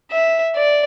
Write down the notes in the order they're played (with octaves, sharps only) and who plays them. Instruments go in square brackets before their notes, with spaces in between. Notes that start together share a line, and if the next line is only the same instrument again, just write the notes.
[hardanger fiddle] E5
D5